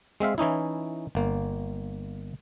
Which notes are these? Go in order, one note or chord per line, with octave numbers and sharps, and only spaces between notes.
G#3 C4 E5 F5
E3 C#4 D#4 E4
G1 A#3